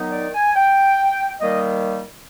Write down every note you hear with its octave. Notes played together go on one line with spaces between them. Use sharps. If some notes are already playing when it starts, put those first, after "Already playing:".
Already playing: D#3 F#3 B3 D#4
D5
G#5
G5
D#3 G3 A#3 D#5